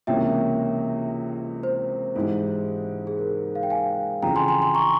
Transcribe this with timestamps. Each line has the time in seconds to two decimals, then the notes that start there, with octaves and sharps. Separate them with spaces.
0.07 C#2 C3 E3 A#3 C#4 E5 G5
1.63 C5
2.15 G#2 E3 G#3 E4 G4
3.07 G#4
3.19 A#4
3.55 F5
3.63 G5
3.70 F5 G#5
4.22 F2 C#3 E3 G5 A#5
4.36 G#5 C6
4.48 G#5 C6
4.62 G#5 C6
4.75 A#5 C#6